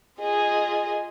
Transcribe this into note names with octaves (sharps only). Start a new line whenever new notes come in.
F4 G#4 D#5